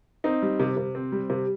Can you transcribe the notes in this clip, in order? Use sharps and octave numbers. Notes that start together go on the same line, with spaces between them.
C4 D#4
G3
C3
C3
C4
G3
C3